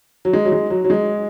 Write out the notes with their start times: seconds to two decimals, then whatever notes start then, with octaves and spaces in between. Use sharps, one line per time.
0.25 F#3
0.33 G#3
0.45 F#3
0.52 G#3
0.70 F#3
0.84 F#3
0.90 G#3